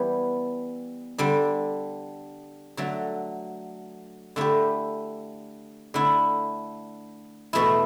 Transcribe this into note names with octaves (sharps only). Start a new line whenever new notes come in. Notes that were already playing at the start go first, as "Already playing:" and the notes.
Already playing: E3 G3 B3 E4 G4
D3 G3 D4
D3 F#3 A3
D3 A3 E4 G4
D3 A3 E4
E2 B2 A3 E4